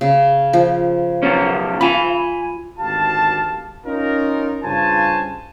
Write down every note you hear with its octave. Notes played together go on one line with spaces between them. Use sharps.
C#3
F3
B2 F#3 C#4
F4 G#5 B5
G#1 D2 G4 F5 A5
C#4 D#4 F4 A#4
G2 C#3 F4 C5 G#5 A5